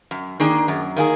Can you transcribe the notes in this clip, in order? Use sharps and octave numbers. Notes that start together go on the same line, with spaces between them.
F#2
D#3 A#3 D4 G#4
F#2
D#3 A#3 D4 G#4